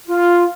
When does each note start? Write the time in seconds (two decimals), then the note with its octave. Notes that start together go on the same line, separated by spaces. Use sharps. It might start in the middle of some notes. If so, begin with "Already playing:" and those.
0.07 F4